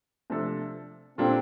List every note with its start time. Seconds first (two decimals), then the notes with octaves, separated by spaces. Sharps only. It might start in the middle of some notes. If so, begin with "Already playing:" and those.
0.30 C3 F3 A3 D4 A4
1.18 A#2 G3 C4 D4 F4 A4